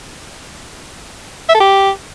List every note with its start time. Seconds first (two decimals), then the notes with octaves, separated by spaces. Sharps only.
1.49 E5
1.55 A4
1.60 G4